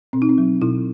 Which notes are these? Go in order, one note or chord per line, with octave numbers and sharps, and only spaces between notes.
B2 C4
D#4
C4
F#3
B2 E4